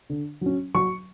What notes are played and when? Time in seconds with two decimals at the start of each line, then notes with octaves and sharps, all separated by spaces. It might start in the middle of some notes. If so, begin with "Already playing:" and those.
0.10 D3
0.41 F#3 C#4
0.75 F#3 C#6